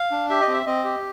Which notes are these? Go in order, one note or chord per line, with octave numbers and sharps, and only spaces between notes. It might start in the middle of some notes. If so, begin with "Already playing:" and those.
Already playing: F5
D4
G4 E5
D#5
C4
E5
C4 D#5
G4